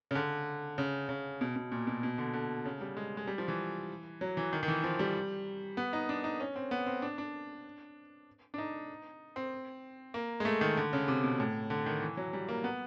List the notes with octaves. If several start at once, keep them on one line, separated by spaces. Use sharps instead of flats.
C#3
D3
C#3
C#3
B2
B2
A#2
B2
B2
D3
D3
C#3
G3
G#3
G#3
G3
F3
E3
F#3
E3
D#3
D#3
E3
F3
G3
B3
D#4
D4
D#4
C#4
C4
B3
C4
D4
D4
D4
D#4
C4
A#3
G#3
A3
D#3
D3
C#3
C3
B2
A2
D3
D#3
E3
F#3
G3
A#3
B3